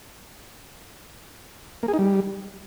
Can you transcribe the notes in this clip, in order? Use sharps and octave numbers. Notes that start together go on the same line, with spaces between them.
A#3
G#4
D#4
G3